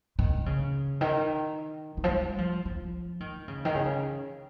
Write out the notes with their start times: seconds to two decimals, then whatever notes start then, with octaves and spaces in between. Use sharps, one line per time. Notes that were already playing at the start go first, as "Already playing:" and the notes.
0.19 D#3
0.46 C#3
1.01 D#3
1.97 D#3
2.04 F3
2.11 G3
2.38 F3
2.65 F3
3.20 D#3
3.48 C#3
3.65 D#3
3.75 C#3